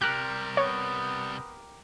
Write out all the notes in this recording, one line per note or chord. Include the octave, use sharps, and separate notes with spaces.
C3 G3 G4 A#4 F#6
B3 C#5